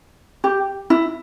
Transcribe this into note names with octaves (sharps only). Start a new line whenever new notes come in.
G4
E4